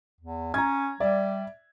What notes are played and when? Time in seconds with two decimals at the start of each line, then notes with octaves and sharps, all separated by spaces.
0.21 E2
0.54 C#4 A#5 G#6
1.00 G3 D5 E5